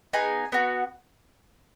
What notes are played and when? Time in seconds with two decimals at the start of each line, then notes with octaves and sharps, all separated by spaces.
0.13 B3 D#4 G#4 G#5
0.52 B3 F#4